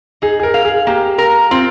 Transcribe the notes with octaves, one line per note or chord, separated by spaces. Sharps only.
D#4 G#4
G#4
A#4
F5
G#4
A#3 G4
A#4
C4 F4